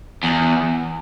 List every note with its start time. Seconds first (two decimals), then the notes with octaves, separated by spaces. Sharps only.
0.23 E2